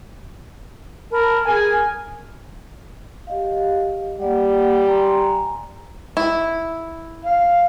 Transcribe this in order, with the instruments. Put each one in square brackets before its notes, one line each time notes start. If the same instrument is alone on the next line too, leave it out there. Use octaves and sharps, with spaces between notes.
[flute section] A#4 A5 B5
[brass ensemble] G#4 G#5 [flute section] A#4
[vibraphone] G4 D#5 F5
[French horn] G3 [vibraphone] A#3 D5 F#5
[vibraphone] G#5 A#5 C6
[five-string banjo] E4
[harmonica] F5